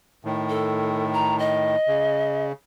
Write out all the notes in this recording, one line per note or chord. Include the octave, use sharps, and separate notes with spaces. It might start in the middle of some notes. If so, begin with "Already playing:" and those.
A2 D#3
A4
A#5
D#5
C#3